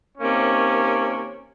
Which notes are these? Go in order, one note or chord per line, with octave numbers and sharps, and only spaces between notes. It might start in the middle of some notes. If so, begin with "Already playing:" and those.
C3 D#3 A#3 C#4